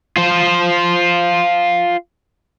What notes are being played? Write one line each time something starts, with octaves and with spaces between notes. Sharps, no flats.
F4 C5